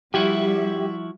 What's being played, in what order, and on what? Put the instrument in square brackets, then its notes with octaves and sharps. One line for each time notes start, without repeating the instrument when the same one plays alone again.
[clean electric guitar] F3 E4 F#4 [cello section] G3 E5 [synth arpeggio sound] G4